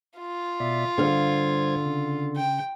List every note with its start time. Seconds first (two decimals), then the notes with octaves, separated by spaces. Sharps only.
0.19 F4
0.60 B2 D5 E5
0.98 G2 D3 C5 F5 G#6
1.86 C#3
2.37 G5